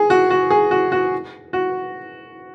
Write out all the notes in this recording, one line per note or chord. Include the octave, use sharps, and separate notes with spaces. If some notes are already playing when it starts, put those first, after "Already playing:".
Already playing: G#4
F#4
F#4
G#4
F#4
F#4
F#4